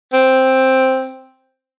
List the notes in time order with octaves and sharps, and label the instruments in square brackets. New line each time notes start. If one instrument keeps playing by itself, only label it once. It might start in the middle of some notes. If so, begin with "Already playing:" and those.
[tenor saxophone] C4